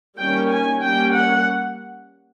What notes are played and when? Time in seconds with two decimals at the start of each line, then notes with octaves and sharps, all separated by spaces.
0.19 D#3 G3 A#3 C#4 G5
0.51 G#5
0.83 G3 A#3 C#4 G5
1.15 F#5